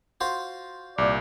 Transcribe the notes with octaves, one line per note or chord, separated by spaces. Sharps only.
F4 F#4 C5
C2 A#2 D5